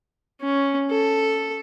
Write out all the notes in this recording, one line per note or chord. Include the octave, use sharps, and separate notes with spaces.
C#4
A4